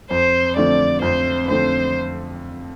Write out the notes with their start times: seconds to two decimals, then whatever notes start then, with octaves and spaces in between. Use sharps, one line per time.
0.11 F2 C5
0.56 D3 F3 A3 C4 D5
1.02 F2 C5
1.48 D3 F3 A3 C4 C5